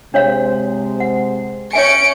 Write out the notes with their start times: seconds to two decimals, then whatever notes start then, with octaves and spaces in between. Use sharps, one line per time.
0.14 C3 G#3 D4 C5 C#5 F5
1.00 F#5
1.73 C#4 C#5 E5 G#5 C#7 D7